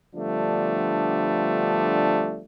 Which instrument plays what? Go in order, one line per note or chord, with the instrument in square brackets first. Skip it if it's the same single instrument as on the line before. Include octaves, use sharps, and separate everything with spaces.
[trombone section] D3 F3 G3 A3 B3 D4